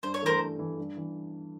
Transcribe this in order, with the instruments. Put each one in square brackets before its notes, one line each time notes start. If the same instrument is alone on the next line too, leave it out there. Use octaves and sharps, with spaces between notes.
[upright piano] G2 [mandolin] C5
[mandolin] C#5
[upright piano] E3 A3 [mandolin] A#4 C5
[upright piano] G2
E3 A3
G2
E3